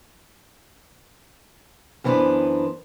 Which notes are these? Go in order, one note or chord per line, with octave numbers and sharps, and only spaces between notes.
F#2 E3 B3 D4 C5